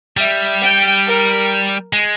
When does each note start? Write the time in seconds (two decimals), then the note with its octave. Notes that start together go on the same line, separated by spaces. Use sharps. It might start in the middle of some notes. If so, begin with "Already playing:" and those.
0.17 G3 E5
0.62 G5
1.06 A#4
1.93 G#3